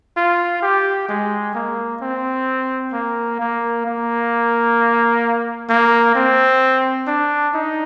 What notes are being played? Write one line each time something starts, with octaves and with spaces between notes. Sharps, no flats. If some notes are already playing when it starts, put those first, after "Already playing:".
F4
G4
G#3
A#3
C4
A#3
A#3
A#3
A#3
C4
D4
D#4